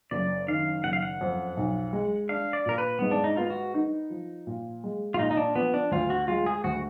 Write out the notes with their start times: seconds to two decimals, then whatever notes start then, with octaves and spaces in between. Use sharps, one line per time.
0.11 F#1 D5
0.48 D#3 F5
0.84 F#1 F#5
0.93 F5
1.02 F#5
1.21 F2
1.57 B1
1.93 G#3
2.29 D4 F5
2.53 D5
2.66 A#2 A#4
2.78 B4
2.99 G#2 B3
3.11 D4
3.24 D#4
3.37 B3 F4
3.50 F#4
3.74 D#4
4.10 F3
4.47 A#2
4.84 G#3
5.14 F4
5.19 A#2 D#4
5.31 D#4
5.37 D4
5.55 F3 B3
5.74 D4
5.91 D2 F4
6.10 F#4
6.28 G#3 F4
6.46 G#4
6.64 D2 F#4